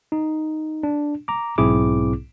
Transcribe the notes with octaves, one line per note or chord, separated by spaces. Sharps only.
D#4
D4
A#5 D6
B1 G#2 C4 E4 G#4 D6